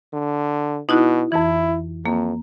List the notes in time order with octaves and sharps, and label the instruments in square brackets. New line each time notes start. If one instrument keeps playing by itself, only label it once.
[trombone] D3
[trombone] B2 [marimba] D#4 E4 F#4
[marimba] F2 E3 [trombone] E4
[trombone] F2 [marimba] A#3